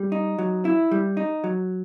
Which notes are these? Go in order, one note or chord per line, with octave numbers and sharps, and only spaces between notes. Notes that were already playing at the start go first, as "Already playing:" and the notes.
Already playing: G3
D#4
F#3
E4
G3
D#4
F#3